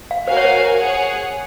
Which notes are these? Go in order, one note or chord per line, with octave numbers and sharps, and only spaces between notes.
F5
F#4 A#4 C5 F5 G#5
C#5
C5
G#4 C#5 F#5